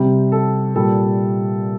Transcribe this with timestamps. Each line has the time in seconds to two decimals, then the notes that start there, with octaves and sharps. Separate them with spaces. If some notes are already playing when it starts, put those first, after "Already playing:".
Already playing: C3 G3 G4
0.32 A4
0.75 A#2 G3 A4